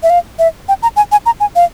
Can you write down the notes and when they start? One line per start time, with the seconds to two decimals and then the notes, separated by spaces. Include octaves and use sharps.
0.03 E5
0.10 F5
0.39 E5
0.69 G5
0.83 A#5
0.96 G#5
1.12 G#5
1.26 A#5
1.40 G#5
1.56 F5